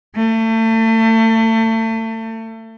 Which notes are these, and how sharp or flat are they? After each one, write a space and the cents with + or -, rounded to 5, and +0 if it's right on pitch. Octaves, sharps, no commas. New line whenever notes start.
A3 +35